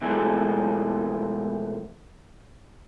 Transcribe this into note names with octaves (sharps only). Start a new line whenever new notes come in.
B2 E3 F3 G#3 A3